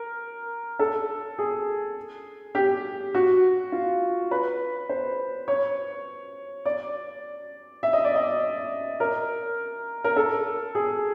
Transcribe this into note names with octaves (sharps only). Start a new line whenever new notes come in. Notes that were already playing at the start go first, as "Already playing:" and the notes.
Already playing: A#4
A4
G#4
G4
F#4
F4
B4
C5
C#5
D5
E5
D#5
D5
D#5
A#4
A#4
A4
G#4